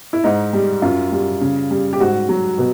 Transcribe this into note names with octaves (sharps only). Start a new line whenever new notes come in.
E4
G#2 D#4
G3
F#2 F4
G3
C#3
G3
G4
G#2 F#4
F#3
B2